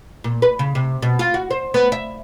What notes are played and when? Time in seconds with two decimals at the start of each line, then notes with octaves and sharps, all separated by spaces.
0.24 A#2
0.42 B4
0.59 C#3
0.75 C3
1.02 B2
1.19 F4
1.34 F#4
1.51 C5
1.74 B3
1.92 E5